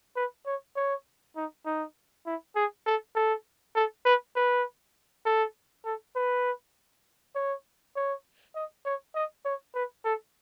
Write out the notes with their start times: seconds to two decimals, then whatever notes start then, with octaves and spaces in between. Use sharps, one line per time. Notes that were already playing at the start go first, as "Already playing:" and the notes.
0.16 B4
0.46 C#5
0.76 C#5
1.36 D#4
1.66 D#4
2.26 E4
2.56 G#4
2.86 A4
3.16 A4
3.75 A4
4.05 B4
4.36 B4
5.26 A4
5.85 A4
6.15 B4
7.35 C#5
7.96 C#5
8.55 D#5
8.85 C#5
9.15 D#5
9.45 C#5
9.75 B4
10.05 A4